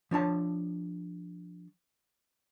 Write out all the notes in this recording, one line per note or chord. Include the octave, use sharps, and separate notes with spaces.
F3 D4 C#5 A5